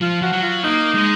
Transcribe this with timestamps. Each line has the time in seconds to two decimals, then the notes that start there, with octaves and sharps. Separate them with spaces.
0.01 F3 F4
0.21 F3 F#4
0.32 F#3
0.43 F4
0.63 A#3 D#4
0.94 G#3